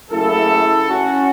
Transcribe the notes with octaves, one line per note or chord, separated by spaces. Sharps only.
F#1 F#2 C#3 A3 E4 A4
C#4 F#4